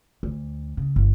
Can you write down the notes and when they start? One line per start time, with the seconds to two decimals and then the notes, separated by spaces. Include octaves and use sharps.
0.23 D2
0.77 C#3
0.96 G1